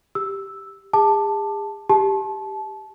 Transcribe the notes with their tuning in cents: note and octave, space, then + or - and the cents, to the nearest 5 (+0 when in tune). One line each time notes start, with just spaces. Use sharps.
G4 +0 E6 +0
G#4 -40 A5 +0 D6 +20
G4 +0 A5 -25